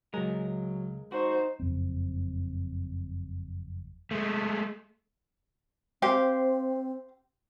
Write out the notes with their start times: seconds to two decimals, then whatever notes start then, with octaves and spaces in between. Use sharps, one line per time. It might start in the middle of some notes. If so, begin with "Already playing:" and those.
0.14 C#2 F#3 G#3 A#4
1.12 D#4 F#4 C5
1.60 F#1 F2 C4
4.11 G#3 A3
6.02 C4 G4 C5 F5